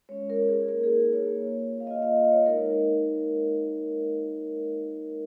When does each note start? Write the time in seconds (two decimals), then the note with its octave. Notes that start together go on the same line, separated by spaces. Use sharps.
0.09 G#3 C#4 F4 C#5
0.30 A#4
0.49 G#4
0.68 A#3 D#4 A#4
0.84 G#4
0.98 A#4
1.13 C#5
1.27 A#3 F4
1.80 F5
1.87 A#3 F4 D#5
2.02 D#5
2.17 D#5
2.31 C#5
2.46 G#3 D#4 A#4